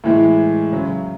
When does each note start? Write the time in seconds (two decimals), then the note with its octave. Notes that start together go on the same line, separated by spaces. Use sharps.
0.04 A2 E3 G#3
0.72 C#3 F#3